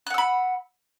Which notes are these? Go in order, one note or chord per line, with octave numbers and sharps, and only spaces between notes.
F#5 B5 E6 F#6